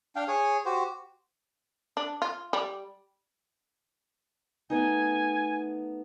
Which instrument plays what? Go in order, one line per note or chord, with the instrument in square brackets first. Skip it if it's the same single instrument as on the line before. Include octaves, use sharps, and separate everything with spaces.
[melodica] D4 F5 G5
G#4 C#5
F#4 G4 C5
[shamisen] D4
F4
G3
[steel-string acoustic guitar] A3 B3 D#4 [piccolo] G#5